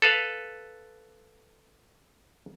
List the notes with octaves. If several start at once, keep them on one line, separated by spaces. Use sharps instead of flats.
A4 B4 F5